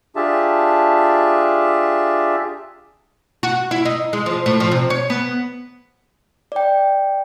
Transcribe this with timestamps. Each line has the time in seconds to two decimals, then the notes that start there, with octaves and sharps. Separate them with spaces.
0.16 D4 F4 G4 G#4 E5 A5
3.43 F#4
3.71 E4
3.85 D#4
4.13 G#3
4.26 F3
4.46 A2
4.60 F3
4.72 C3
4.90 C#5
5.10 B3
6.52 D5 G5